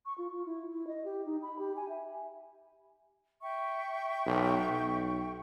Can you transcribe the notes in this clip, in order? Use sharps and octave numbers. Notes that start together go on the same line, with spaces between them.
C#6
F4
F4
E4
E4
D#5
G4
D#4
B5
G4
G#5
E5
E5 G5 C#6
B1
B1